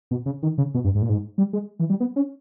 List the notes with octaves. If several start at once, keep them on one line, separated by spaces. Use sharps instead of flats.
B2
C#3
D#3
C#3
B2
G2
G#2
A#2
G#2
G3
G#3
E3
G3
B3
C#4